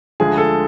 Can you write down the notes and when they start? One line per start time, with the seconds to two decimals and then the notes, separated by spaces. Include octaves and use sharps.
0.20 D2 D3 F3 G#3 G#4
0.38 A4